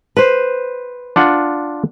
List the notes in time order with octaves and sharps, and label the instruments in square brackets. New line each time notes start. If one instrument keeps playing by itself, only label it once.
[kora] B4 C5
[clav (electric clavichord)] D4 F4 F#5